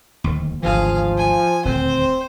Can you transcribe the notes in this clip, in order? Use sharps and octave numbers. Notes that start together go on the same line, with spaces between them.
D1 D#2
G#1 D2 E3 F3 G#4 F5
G#5
D#1 D2 C4 C5